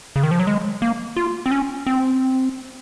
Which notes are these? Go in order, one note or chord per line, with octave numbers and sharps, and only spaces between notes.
C#3
D#3
F3
F#3
G#3
A#3
F4
C4
C#4
C4